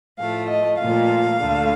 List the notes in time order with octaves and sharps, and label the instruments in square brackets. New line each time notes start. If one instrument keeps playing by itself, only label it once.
[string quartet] A2 F3 A3 F5
D#5
A#2 F3 A3 F5
D2 D3 A3